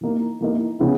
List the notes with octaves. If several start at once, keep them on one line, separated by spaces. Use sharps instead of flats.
E3 A#3 D#4
E3 A#3 D#4
C#3 E3 B3 E4